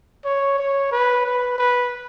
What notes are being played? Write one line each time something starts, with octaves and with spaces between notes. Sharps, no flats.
C#5
C#5
B4
B4
B4